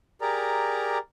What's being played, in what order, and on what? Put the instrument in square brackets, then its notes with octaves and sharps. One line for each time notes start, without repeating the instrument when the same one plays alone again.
[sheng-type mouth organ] G4 G#4 A#4 D5 A#5